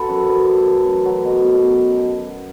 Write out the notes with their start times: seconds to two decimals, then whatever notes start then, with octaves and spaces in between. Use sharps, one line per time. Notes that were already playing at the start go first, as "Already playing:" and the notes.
Already playing: E3 F#4 A4 B4
0.08 F#2
0.28 F#2
0.47 A3
0.67 E3
0.86 F#2
1.05 F#3
1.24 B2
1.44 B2